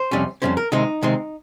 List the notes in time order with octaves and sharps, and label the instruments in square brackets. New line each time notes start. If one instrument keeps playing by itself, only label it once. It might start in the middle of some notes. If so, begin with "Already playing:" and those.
Already playing: [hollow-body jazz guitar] C5
F2 C3 G3 C#4
F2 C3 G3 C#4 C5
A#4
C3 D#3 G#3 C4 D#4
C3 D#3 G#3 C4